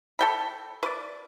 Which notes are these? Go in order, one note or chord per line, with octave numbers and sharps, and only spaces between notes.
A4 G5 B5
B4 D5